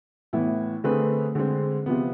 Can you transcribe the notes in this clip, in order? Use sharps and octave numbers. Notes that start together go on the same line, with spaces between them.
A2 E3 B3 E4
D3 A3 C4 G#4 B4
D3 G#3 C4
C3 F3 B3